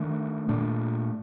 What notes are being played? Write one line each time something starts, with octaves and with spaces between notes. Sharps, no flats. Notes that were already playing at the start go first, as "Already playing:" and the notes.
Already playing: D#3 A3 D4
A#2 A3 D4